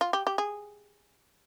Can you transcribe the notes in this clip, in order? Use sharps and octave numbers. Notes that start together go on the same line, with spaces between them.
F4
G4
G4
G#4